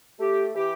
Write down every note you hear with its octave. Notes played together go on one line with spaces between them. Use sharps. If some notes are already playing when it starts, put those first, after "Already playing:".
A3 G4
E3 G4